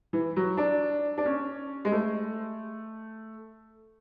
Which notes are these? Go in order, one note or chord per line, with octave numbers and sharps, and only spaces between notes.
E3
F#3
D4
D4
C#4
G#3
A3